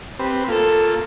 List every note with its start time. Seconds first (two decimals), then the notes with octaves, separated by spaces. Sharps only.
0.20 C4 G4 B4
0.48 A#3 F4 A4